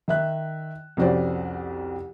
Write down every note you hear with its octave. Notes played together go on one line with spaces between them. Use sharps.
D#3 E5 F#6
C2 F2 C#4 F#4 C5 D5